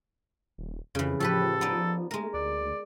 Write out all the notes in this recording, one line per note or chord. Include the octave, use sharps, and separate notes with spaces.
D#1
F2 C#3 E3
A2 F3 G4 A4 B4
B3 D#4 D5
G#3 A3 A#4
D2 D5